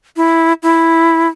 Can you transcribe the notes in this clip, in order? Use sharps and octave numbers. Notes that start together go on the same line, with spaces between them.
E4
E4